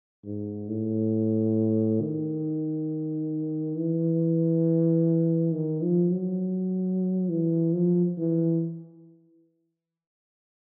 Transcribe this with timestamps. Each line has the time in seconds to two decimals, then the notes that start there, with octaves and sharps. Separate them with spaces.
0.25 G#2
0.68 A2
2.01 D#3
3.77 E3
5.53 D#3
5.82 F3
6.12 F#3
7.29 E3
7.73 F3
8.18 E3